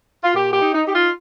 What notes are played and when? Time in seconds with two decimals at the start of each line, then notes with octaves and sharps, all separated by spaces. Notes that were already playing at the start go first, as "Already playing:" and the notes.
0.22 F4
0.33 A#2 G4
0.53 G4
0.60 D#4
0.73 D#4
0.85 D#4 G4
0.92 F4